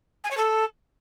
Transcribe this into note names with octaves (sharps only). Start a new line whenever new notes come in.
G#5
C#5
A4